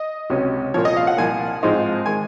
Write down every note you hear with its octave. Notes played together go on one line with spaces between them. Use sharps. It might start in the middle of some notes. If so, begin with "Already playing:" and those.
Already playing: D#5
C#2 C3 F#3 C#4
C2 A#2 F3 C#5
D#5
F5
F#5
C2 A#2 F3 G#5
G#2 F3 G#3 C4 D#4
D#3 G#3 G#5